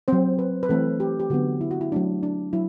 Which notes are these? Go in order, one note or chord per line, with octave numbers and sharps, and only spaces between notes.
F#3 C4 C5
B4
B4
E3 A3 C4 A4
G4
G4
D3 F#3 B3 F#4
E4
F#4
E4
F#3 A3 C4 D4
D4
F#3 E4